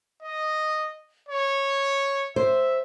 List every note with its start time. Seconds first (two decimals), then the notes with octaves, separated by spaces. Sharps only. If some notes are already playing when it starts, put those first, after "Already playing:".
0.23 D#5
1.29 C#5
2.36 C5 E5